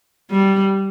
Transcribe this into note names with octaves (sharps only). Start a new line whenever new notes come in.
G3